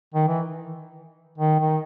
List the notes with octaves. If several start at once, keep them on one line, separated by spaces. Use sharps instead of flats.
D#3
E3
D#3
D#3